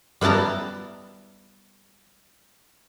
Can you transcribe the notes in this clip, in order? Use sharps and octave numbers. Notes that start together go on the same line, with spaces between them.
G3 B3 E4 A5 A#5